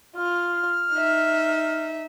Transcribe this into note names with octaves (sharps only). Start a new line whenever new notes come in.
F4 F6
D#4 E5